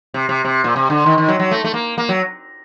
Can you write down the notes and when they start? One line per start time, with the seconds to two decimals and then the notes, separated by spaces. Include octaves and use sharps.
0.14 C3
0.29 C3
0.45 C3
0.64 A#2
0.76 C3
0.90 D3
1.06 D#3
1.18 D#3
1.28 F#3
1.39 F#3
1.51 A3
1.64 A3
1.74 A#3
1.98 A#3
2.09 F#3